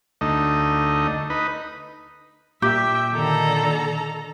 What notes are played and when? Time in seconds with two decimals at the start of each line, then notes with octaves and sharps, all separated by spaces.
0.21 D2 A3 D#4
1.30 D#4 B4
2.62 A#2 G4 E5 G5
3.13 D3 D#3 A4 A#5